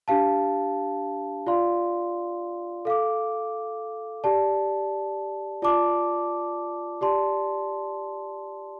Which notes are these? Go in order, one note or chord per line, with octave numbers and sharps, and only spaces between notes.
D4 G4 F5 A5
F4 D5 F5 C6
A4 F5 D6
G4 D5 A5
F4 D5 A5 D6
G4 D5 A5 C6